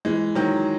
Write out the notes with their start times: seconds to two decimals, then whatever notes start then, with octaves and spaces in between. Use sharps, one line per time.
0.05 E3 G#3
0.35 D#3 F#3